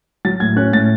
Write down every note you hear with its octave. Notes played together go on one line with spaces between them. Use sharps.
F#3 A6
A2 G#6
C#4 F#6
A2 A6